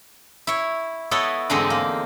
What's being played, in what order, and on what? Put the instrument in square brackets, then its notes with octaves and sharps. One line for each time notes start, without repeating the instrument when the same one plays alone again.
[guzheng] E4 C#5
B3 E4 A4 C#5 D#5
E2 G#2 D3 G#3 C4 D#4
A#3